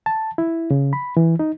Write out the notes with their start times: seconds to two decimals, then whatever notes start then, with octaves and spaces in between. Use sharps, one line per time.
0.06 A5
0.38 E4
0.71 C#3
0.93 B5
1.17 E3
1.39 D#4